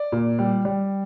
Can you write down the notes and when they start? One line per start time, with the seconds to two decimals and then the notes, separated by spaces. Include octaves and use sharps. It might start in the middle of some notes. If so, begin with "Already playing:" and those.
Already playing: D5
0.12 A#2
0.39 G3
0.65 G3